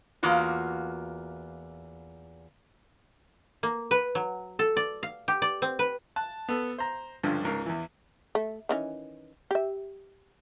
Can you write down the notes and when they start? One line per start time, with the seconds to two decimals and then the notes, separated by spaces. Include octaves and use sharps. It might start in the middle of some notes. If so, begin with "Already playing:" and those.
0.23 E2 A#3 F4 F#4
3.63 A#3
3.91 B4
4.15 F#3
4.59 A4
4.77 D5
5.03 F5
5.28 G4
5.42 D5
5.62 C4
5.79 B4
6.16 A5 F#6
6.49 B3 A4
6.79 C5 A#5
7.23 C#2 G2 D3 F3
7.45 C#2 G#2 A#4
7.66 E2 E3
8.35 A3
8.69 D#3 E3 C#4
9.51 G4 E5